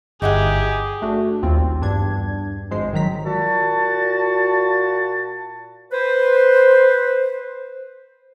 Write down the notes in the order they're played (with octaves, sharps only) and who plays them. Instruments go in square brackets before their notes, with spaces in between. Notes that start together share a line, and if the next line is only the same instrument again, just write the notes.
[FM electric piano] G1 [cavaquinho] D#4 E4 F#5 [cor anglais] G4 [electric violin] G#4
[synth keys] A3 D4 F#4
A#1 D#2 C4 F4
E2 G2 D4 G#6
G#1 F3 G#3 C5 C7
D#3 F#3 A#5 B6
[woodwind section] A#2 F#4 A5
B4 C5